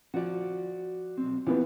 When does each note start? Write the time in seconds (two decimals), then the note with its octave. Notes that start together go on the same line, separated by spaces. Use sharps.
0.14 F3 F#4 D5
1.18 B1 C4
1.47 E3 B3 C4 F4 G4